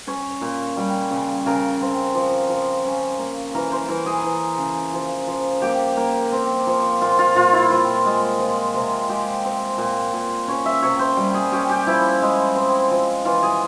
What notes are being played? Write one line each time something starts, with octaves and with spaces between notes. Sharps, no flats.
C#4 C#5
A#2
G3
C#3
C#3 A#4
C4
F3
F3
C#4
A#3
E3 A#4
C5
E3 A#4
G#4
E3
C#3
F3
F3
A#3 G4
A#3
C4
F3
A#2 F4
F4
A#2 F4
E4
C4 F4
G#3
F3
C3
G#3 G4
C4
A#2
A#2
C#4 C#5
E5
C3 C#5
C5
G3
G#4
C#4 G4
G4
F3 E4
G#3
C4
F3
E3 F4
G#4